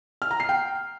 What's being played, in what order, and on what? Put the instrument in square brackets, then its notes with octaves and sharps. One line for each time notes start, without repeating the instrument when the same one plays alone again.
[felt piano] F6
A#5
C7
G5